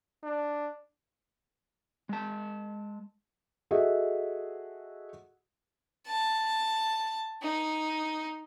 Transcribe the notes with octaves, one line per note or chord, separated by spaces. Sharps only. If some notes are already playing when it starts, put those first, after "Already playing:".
D4
G#3 A5
F#4 G#4 A4 D#5 E5 F#5
A5
D#4